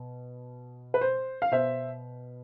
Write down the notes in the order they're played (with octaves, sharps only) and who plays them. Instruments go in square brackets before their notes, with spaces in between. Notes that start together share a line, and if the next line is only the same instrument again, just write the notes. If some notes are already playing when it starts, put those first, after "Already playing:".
Already playing: [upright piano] B2
B4
C5
F5
B2 C5 E5